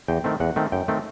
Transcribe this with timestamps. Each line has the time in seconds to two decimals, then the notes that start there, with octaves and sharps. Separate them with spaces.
0.08 E2 G5
0.24 D#3 A3 C4
0.40 E2 F#5
0.56 D#3 A3 C4
0.72 F#2 G5
0.88 D#3 A3 C4